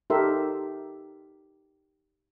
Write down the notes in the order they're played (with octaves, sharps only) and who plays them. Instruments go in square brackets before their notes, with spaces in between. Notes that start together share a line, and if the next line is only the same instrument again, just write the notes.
[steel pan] D#4 G4 A4 A#4 E5 C6